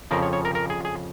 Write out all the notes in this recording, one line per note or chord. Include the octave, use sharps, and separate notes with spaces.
F2 C#3 F3 A#4
C#5
C#5
A#4
A#4
G#4
G#4